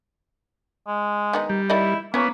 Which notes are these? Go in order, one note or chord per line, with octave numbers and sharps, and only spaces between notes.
G#3
D#3 B3 D#4
G3
D#3 E4 D5 D#5
A#3 B3 C#4 E4 C#5